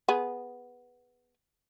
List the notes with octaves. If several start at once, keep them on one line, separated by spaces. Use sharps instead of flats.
B3 G#4